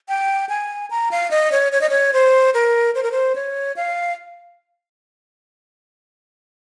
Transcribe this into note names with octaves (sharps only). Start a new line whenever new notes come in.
G5
G#5
A#5
F5
D#5
C#5
C#5
D#5
C#5
C5
A#4
C5
A#4
C5
C#5
F5